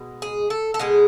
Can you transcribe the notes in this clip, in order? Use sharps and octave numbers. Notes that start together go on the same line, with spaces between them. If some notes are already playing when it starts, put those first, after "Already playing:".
Already playing: B2 G#3
G#4
A4
A4
B2 G#3 G#4